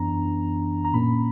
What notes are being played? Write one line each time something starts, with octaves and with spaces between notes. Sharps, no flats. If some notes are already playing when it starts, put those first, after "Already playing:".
Already playing: F#2 E3 B3 D4 A#5
A#5
A#2 A#3 C#4 B5